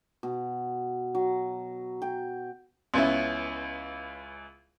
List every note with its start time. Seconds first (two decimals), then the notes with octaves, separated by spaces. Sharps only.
0.23 B2
1.15 F#3
2.02 G5
2.94 C#2 B3 C#4 E4